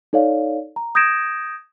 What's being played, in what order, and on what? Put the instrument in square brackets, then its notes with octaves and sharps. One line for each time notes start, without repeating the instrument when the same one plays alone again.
[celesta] D#4 A4 C#5 D5 F5
A#5
D#6 G6 G#6 A#6 D7 E7